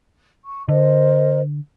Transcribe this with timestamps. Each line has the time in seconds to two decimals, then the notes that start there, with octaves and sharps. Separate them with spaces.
0.43 C#6
0.68 D3 A#4 C5 D#5